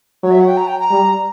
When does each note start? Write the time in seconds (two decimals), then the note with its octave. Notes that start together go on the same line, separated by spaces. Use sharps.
0.23 F#3 C#5
0.31 E5
0.40 F#5
0.48 G5
0.57 A#5
0.68 G5
0.80 A#5
0.91 G3